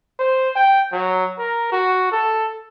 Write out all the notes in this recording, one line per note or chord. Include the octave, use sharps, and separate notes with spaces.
C5
G5
F#3
A#4
F#4
A4